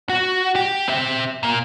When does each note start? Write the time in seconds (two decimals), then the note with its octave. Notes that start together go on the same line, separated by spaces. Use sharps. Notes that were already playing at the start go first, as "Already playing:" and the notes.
0.09 F#4
0.56 G4
0.88 C4 E5
1.43 A#2 A#3